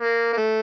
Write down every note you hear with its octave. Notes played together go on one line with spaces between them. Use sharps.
A#3
A#3
A3